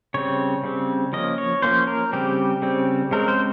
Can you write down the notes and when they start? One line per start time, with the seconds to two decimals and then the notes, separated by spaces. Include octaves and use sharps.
0.14 C#3 G3 C4 C#5
0.64 C#3 G3 C4
1.13 F3 A#3 C#4 D#5
1.38 C#5
1.62 F3 A#3 C#4 C5
1.87 A#4
2.13 C#3 G3 C4 G4
2.62 C#3 G3 C4
3.11 C#3 G#3 C4 A#4
3.28 C5